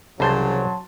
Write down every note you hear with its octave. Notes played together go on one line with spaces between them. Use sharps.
C2 C#3 E3 F#3 C5 A5 C6 A6